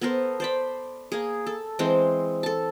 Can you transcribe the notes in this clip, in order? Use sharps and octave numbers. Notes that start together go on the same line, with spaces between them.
B3 A4 A#4 C5
C5 D5 B5
A#3 G#4
A4
E3 G#3 C4 C5
A4 A5